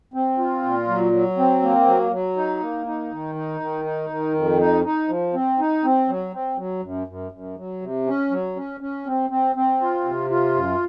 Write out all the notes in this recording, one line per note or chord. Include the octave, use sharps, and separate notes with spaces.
C4
F4
A#2
F#3
F#3
C4
A#3
F#3
F#3
D#4
A#3
D#4
D#3
D#4
D#3
D#4
D#3
F2
D#4
D#4
F3
C4
D#4
C4
F#3
C4
F#3
F#2
F#2
F#2
F#3
C3
C#4
F#3
C#4
C#4
C4
C4
C4
F4
C3
F4
F#2